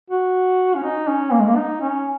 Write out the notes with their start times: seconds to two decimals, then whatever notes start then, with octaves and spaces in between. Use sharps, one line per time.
0.10 F#4
0.75 C#4
0.83 D#4
1.08 C#4
1.32 A#3
1.40 G#3
1.47 A#3
1.57 D#4
1.81 C#4